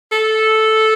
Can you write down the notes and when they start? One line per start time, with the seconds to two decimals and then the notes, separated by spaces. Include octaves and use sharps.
0.12 A4